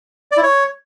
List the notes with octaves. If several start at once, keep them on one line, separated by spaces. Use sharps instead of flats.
D5
E4
C#5